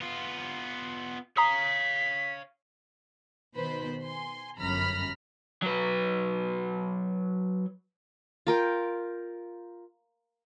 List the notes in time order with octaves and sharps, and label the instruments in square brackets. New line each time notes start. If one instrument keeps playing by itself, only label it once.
[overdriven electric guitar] B3 F4
[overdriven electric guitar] C#5 F5 [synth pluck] A#5 D#6 [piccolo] B6
[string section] B2 D#3 B4 C5 B5
G#5 C6
G1 F#2 A#5 B5 F6
[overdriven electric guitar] F#3 B4
[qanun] F4 A#4 G5